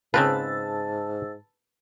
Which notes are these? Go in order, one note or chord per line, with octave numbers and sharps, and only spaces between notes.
G#2 C#3 C4 F4 B4 A5 E6 A6